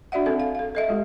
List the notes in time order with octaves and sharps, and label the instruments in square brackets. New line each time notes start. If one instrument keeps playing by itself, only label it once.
[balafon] D4 F#4 D5 E5 F#5
C4 A4 E5
F5
A4 F5
A4 D#5 E5
G#3 F4 G4